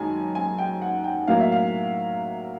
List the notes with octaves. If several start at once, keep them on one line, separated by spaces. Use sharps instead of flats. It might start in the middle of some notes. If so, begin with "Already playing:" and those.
Already playing: F#2 D#3 G#3 G#5 A5
G#5
G5
F#5
G5
A2 F#3 A#3 F5
E5
F5